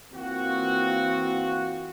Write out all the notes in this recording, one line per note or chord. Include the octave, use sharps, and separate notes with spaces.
E3 A#3 C4 F4 F#4